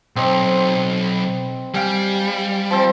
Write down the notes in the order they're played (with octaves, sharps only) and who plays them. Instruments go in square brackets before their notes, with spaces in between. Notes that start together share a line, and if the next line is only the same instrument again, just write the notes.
[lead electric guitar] B1 [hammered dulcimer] C4 D#5
[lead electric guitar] G3 [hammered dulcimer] F5 G5 G#5
[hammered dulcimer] F3 C4